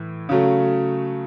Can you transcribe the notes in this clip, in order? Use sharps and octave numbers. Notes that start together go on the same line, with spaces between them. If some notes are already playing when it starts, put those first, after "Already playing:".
Already playing: A2 E3
C#3 F#3 A3